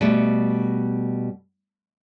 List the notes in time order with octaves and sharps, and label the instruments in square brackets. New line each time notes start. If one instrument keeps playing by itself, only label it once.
[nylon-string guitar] B2 G3 A3